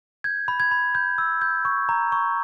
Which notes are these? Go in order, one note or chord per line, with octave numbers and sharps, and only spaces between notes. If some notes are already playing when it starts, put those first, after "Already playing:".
G6 G#6
B5
G#6
B5
G6
E6
G6
C#6
A#5
C#6